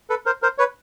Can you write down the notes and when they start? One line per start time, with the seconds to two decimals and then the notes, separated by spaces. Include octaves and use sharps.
0.10 A4 B4
0.26 A#4 C5
0.42 A#4 C5
0.58 B4 C#5